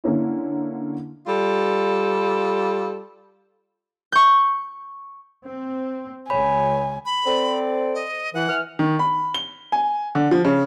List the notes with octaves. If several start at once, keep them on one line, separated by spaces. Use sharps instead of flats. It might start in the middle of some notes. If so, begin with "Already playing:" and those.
D3 A#3 C#4 E4
G3 F4 A4
C#6 G6
C4
C#2 C#5 G#5 B5
B5
C4 A4 D5
D#5
E3 F#5
E3 F6
D#3
B5
G7
G#5
D3
F3
C#3